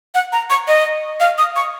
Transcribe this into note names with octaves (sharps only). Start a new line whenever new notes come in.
F#5
A#5
C#6
D#5
F5
D#6
C#6